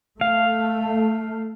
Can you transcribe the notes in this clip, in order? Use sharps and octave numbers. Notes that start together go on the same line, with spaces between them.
A3 F5